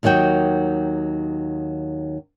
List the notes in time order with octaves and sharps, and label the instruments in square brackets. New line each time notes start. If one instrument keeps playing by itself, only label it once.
[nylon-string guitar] D#2 D#3 F#3 F#4 G5